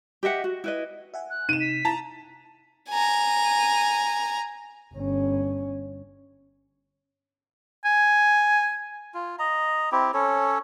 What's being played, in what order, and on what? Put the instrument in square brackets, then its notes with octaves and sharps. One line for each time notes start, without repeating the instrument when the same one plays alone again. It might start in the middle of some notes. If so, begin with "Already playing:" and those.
[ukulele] G4 D#5 E5 F#5
F#4
E4 B4 D#5
[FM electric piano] E5 F#5 G#5
[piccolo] F#6
[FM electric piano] C3 D#4 [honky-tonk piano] D#7 E7
[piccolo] B6
[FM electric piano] E4 [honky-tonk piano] A5 A#5
[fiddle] G#5 A#5
[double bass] G1 C#4
[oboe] G#5
[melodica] F4
D#5 A#5
C4 E4 G4
C#4 A4 C#5